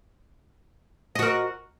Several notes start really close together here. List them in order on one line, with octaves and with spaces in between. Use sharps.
D#5 F#4 A#4